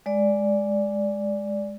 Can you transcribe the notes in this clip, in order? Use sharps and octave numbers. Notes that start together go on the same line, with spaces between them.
G#3 D5